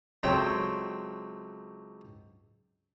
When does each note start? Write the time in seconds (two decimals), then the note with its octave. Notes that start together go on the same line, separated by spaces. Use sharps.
0.23 C#2 F#3 A3 C4 C#5 G5